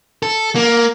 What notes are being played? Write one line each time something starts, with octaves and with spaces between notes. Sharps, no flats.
A4
A#3